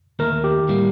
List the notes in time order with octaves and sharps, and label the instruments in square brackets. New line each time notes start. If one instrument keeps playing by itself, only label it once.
[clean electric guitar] D#2 D#3 A3 [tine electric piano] A#4
[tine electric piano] G4
[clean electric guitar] A2 G3 A#3